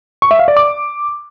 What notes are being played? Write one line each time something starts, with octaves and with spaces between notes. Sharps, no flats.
C#6
E5
F5
D5
D6